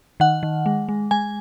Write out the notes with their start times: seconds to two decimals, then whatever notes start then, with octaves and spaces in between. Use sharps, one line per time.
0.20 D#3 F#5
0.43 D#3
0.66 G#3
0.89 G#3
1.11 G#3 G#5